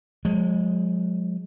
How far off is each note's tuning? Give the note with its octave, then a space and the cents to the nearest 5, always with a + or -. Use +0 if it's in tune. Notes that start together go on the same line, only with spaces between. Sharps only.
F3 +45 G#3 +0